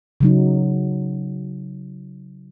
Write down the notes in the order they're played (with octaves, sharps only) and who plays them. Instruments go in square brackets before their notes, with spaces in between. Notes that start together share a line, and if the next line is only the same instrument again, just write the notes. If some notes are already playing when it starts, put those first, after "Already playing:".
[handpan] C#3 F#3 D#4